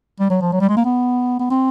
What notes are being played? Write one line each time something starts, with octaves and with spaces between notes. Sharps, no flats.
G3
F#3
F3
F#3
G3
G#3
A#3
B3
B3
C4